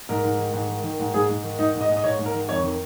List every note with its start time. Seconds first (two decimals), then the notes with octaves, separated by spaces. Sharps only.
0.09 G#2 A#4
0.24 G#2
0.38 D#3
0.54 G#2
0.69 D#3
0.84 D#3
0.99 G#2
1.14 G#2 G#4
1.29 G#2
1.44 D#3
1.59 G#2 D#4
1.75 G#2
1.81 D#5
1.89 G#2
1.97 D#5
2.04 G#2 C#5
2.19 G#2
2.26 A#4
2.34 D#3
2.49 F2 C#5
2.63 D#3